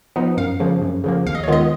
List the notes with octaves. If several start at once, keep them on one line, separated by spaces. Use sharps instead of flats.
F3 B3 D#4
F#2 F5
C#3 F3 A#3
F#2
C#3 F3 A#3
D#2 F5
D#5
C#5
D#3 G#3 B3 F4 D#5